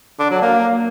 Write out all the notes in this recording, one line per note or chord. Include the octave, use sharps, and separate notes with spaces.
D4
F#3
A#3